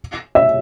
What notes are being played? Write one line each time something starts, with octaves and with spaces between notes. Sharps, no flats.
E5